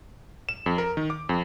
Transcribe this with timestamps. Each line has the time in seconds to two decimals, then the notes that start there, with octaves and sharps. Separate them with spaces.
0.49 E7
0.66 F2
0.78 A#4
0.97 D#3
1.10 D6
1.29 F2